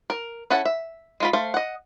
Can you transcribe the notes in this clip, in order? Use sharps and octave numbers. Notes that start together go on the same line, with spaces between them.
A#4
C#4 E4 A4 F#5
E5
G#3 F4 B5
A3 C5 F5
D#5 F#5